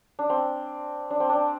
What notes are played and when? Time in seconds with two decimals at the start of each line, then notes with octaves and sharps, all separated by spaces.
0.19 D4
0.30 C4
1.10 D4
1.20 C4
1.30 D4